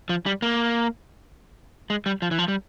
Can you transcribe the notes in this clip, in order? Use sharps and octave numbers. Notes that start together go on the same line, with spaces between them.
F3
G3
A#3
G#3
G3
F3
E3
F3
G3